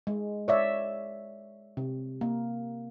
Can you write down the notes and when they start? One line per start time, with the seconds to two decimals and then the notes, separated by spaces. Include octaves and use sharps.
0.07 G#3
0.48 C#5 D5 E5
1.77 C3
2.21 A#3